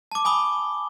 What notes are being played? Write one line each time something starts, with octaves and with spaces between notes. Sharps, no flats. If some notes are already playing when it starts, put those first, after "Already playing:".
A5 D6
G#5 B5 D#6 G7